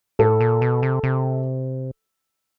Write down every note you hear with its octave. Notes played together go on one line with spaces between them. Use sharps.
A2 A4
A#2
B2
C3
C3